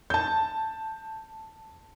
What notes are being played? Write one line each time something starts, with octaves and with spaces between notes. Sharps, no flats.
A5 G6